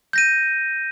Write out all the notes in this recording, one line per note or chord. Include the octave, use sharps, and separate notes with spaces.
G6 A#6 D#7